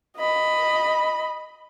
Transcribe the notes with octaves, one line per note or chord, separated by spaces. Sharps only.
D#5 B5